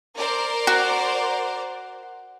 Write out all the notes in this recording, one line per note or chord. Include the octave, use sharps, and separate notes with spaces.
A#4 C5 D5
F#4